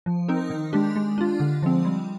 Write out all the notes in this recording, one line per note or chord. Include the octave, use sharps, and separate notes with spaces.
F3
C4 D#4 A#4
D#3
G#3 D4 G4
G#3
D4 F4
D3
F3 G#3 C4
G3